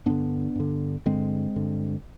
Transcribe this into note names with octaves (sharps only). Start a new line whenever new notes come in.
G2 D3 B3 D4
G2 D3
G2 D3 G#3 C4
G2 D3